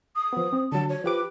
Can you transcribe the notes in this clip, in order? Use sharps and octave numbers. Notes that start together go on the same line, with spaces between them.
D#6
F3 B3
C4
D3 F#3 A5
C#5
F3 G4 B4 D6